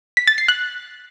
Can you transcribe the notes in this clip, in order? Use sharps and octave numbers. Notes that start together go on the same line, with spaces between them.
B6
A6
C7
F#6